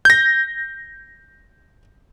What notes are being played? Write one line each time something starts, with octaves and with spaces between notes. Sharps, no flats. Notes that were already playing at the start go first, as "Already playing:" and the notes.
G6 A#6